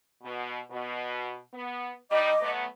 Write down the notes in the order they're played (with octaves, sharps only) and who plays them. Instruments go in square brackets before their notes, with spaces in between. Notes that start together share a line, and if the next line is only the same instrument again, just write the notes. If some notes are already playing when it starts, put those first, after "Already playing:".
[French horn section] B2
B2
B3
[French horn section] G3 D#4 [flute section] D#5 D6
[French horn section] F#3 A3 B3